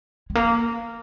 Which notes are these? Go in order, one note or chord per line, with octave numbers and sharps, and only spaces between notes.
G#3
A#3